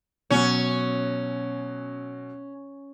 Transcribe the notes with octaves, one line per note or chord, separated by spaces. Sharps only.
B2 F#3 C#4